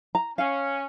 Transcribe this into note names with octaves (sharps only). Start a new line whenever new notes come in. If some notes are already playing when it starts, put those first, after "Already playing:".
A#5
C#4 F5